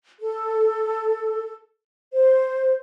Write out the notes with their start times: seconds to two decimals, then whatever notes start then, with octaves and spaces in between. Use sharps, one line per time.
0.20 A4
2.13 C5